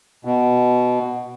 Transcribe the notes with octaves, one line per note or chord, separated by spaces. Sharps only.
B2